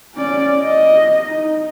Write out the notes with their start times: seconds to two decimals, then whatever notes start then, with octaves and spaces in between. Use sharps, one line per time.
0.15 C#4 D5
0.62 D#5
1.26 D#4